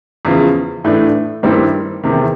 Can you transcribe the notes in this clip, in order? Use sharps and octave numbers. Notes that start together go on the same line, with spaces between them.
E2 C#3 F3
A2 E3 A3 D4
G2 D#3 G3 C4 E4
E2 C3 D#3